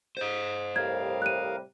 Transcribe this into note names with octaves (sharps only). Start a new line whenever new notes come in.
C5 D#5
A2 C3 G3 A#4 F5 G#6
F#6 D#7